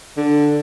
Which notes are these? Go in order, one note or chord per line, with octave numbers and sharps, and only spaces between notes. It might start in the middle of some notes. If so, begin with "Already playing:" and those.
D3